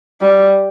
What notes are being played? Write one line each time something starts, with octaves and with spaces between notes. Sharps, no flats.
G3